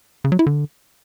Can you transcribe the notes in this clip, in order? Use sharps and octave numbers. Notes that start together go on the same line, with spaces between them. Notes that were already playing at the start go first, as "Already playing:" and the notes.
C#3
F#3
E4
D3